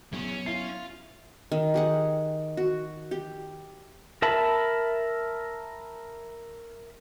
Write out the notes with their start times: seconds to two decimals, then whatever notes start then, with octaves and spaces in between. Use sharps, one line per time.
0.13 F#3 B3 C#4 E4 G#4
0.46 E4 F4 C7
1.52 D#3
1.74 G4 G#4 F#5
2.57 F#4
3.11 G4
4.22 A#4 E5 A5 B5